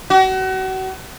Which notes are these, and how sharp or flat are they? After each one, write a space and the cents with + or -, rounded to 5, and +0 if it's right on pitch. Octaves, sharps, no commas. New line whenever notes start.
F#4 +35